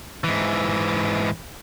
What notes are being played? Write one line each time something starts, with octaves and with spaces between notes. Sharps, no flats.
G#2 E3